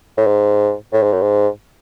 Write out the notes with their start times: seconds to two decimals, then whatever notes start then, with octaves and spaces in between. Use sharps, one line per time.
0.18 A2
0.27 G#2
0.93 A2
1.03 G#2
1.13 F#2
1.22 G#2